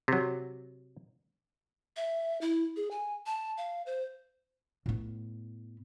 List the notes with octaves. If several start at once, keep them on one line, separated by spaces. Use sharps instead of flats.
C3 F#3
E5
E4
G#4
G#5
A5
F5
C5
A2 B3